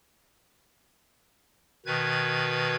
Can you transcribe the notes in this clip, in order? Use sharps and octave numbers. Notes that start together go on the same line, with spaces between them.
B2 D#3 B4 G#6